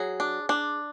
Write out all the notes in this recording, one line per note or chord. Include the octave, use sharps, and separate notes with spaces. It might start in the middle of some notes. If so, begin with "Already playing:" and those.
Already playing: F#3 G#4
D4
D4